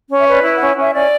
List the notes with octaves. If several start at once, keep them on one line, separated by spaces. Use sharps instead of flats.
C#4
E5
B4 D5
E4 C#5
C#4 F#5
C#4 E5
C#4 D5